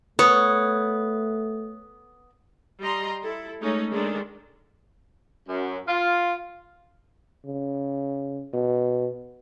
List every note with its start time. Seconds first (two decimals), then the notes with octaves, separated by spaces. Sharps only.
0.19 A3 B3 C#5 D#6
2.81 G3 G4 D#5 A#5 C6
3.22 E4 A4
3.60 G#3 A3 C#4 D#4
3.92 D#3 G#3 D4 A4
5.47 F#2
5.87 F4
7.46 C#3
8.54 B2